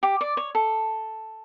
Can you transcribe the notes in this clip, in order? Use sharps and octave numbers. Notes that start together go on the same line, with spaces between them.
G4
D5
C#5
A4